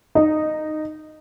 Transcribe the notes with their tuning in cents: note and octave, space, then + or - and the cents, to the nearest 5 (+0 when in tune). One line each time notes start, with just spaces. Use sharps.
D#4 -10